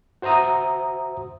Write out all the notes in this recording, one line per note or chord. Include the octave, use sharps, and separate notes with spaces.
F#4 C5 E5 A#5 D#6